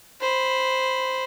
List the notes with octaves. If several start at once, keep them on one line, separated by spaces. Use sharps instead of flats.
C5 B5